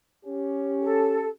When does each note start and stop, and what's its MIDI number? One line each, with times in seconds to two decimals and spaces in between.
0.24 1.28 61
0.24 1.28 67
0.82 1.27 69